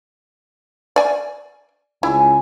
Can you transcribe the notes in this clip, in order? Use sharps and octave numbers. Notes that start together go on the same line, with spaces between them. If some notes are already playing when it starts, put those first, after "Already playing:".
D5 G#5
C#2 E4 G#5